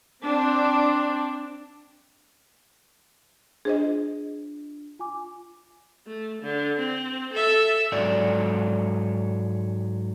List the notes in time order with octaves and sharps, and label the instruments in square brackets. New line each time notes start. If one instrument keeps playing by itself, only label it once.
[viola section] C4 D4
[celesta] D4 F4 [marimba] G#4 C5 D#5
[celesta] F4 G#5 D6
[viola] A3
D3
C4
A4 E5
[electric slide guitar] G#2 F#3 A4 D5